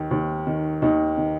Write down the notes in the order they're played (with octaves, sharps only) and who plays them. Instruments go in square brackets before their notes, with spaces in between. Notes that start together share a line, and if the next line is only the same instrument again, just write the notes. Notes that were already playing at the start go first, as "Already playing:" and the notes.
Already playing: [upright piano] D#2 D#3
D#2
D#3
D#2 D#4
D#3